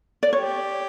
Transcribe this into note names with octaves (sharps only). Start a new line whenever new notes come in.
D5
G4 C#5